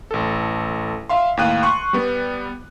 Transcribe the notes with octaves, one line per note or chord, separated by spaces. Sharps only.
A1 A4
E5 F5 C6
D#2 A2 F5 G5 F#6 D#7
C6 C#6 F#6
G3 B3